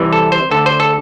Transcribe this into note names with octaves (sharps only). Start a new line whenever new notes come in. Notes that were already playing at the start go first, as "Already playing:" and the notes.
Already playing: C2 C3 E3
A4
C5
D2 D3 A4
C5
A4